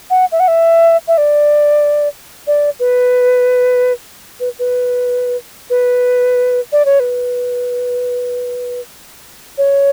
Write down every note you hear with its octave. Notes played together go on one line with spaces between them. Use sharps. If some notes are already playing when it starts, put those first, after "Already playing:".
F#5
E5
F#5
E5
E5
D5
D5
B4
B4
B4
B4
D5
C#5
B4
C#5